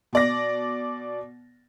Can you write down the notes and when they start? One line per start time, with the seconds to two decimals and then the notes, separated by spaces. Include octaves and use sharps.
0.13 B2 D5 A#6